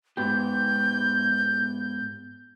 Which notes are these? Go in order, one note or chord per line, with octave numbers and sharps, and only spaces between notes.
G#2 B3 G4 G6